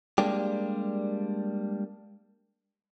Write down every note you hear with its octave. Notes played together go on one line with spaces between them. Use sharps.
G3 G#3 A#3 D4 G4